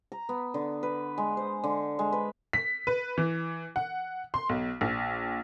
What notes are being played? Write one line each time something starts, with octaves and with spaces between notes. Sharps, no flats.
A#5
B3
D3
B4
G#3
C5
D3
G#3
B4
B6
B4
E3
F#5
C6
B1
A#1